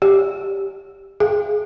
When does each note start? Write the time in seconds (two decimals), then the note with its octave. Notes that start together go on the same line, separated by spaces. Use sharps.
0.02 G4
1.20 G#4